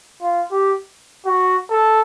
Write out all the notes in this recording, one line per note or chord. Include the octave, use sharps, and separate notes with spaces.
F4
G4
F#4
A4